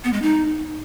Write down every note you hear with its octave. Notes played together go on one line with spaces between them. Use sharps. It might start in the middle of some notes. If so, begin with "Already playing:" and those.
B3
G#3
D#4